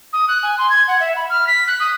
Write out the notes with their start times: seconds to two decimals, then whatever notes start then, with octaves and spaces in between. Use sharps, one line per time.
0.13 D#6
0.28 F#6
0.42 G#5
0.58 C6
0.69 G#6
0.87 F#5
1.00 E5
1.16 B5
1.29 F6
1.47 B6
1.67 F#6
1.79 D#6